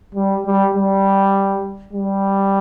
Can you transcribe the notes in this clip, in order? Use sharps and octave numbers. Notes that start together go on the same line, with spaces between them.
G3
G3
G3
G3